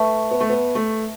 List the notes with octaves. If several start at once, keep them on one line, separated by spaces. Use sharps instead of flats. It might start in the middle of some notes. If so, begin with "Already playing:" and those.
Already playing: A3 B4 E5 A5 C#6
B3
A3
B3
A3